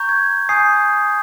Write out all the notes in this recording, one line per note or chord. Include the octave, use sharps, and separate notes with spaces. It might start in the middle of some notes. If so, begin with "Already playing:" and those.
Already playing: A#5 C#6 G6
G#6
G#5 D#6 G6 C7